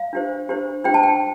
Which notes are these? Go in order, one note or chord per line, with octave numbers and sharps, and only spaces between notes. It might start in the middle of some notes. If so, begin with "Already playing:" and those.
Already playing: F5
D4 G4 C5
D4 G4 C5
D4 G4 C5 G5
A5
G5